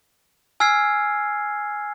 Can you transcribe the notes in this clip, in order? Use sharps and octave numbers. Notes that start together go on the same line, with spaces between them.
G#5 E6 F6 G#6 C7